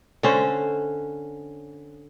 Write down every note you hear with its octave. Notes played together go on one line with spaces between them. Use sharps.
D3 C#4 C5